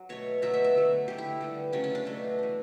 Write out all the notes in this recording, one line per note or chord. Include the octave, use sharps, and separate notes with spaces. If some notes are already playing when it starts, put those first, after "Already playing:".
Already playing: F#3
B2 A3 C#5
B2 F#3 A3 E5
E5
E5
D3 F#3 A3
D3 A3 G4
E4
D3 G3 B3
C#3 F#3 A3 C#4
C#4
D4
B2 A3
E3 A3